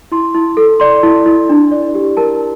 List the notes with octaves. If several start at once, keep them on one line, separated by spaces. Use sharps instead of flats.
E4 C6
E4
A4
D5 C6
E4
E4
D4
D5
G4
A#4 A5